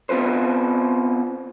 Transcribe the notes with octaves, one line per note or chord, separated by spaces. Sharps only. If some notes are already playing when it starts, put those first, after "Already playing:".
B3 C4 F4 B4 C5